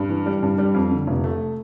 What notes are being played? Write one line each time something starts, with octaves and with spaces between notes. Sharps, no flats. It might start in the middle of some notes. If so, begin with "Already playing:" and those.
Already playing: G2
E3
G3
G2
G3
F2
D3
F1
A3